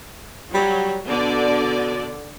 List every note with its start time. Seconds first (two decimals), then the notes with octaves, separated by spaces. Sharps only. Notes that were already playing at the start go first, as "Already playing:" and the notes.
0.54 F#3 G3
1.09 B2 D3 D5